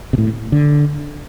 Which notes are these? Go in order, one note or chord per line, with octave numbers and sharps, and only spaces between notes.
C3
A2
D3